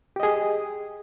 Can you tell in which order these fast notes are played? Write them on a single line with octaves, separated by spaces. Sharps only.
G4 D#5 G#4